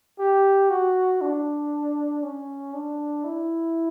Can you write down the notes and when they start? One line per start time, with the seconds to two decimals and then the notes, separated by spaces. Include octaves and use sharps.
0.19 G4
0.70 F#4
1.21 D4
2.23 C#4
2.74 D4
3.24 E4